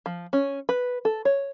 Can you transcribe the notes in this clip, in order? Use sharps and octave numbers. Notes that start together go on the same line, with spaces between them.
F3
C#4
B4
A4
C#5